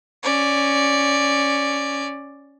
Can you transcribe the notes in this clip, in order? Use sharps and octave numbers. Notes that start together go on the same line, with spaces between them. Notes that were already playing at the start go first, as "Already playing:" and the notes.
C#4 D5